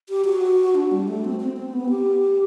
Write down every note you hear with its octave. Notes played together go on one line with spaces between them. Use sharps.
G4
F#4
D4
G3
A3
C4
C4
C4
B3
G4